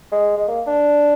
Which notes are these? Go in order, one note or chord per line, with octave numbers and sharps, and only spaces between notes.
G#3
G#3
A#3
D4